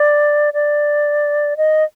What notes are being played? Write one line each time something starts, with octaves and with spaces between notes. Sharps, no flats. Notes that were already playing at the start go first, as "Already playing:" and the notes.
Already playing: D5
D5
D#5